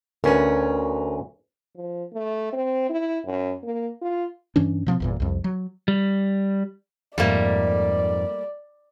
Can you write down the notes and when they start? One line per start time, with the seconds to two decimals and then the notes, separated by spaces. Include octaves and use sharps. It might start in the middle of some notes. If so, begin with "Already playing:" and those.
0.24 D2 C#4 A#4 B4
1.76 F3
2.14 A3
2.53 C4
2.89 E4
3.26 F#2
3.63 A#3
4.02 F4
4.56 G2 E3 C#4 D4
4.87 B2 F3 A3 C4
5.00 G1 E2 A#2
5.20 C2 F2
5.44 F#3
5.88 G3
7.18 F2 G#2 G3 A3 A#3 D5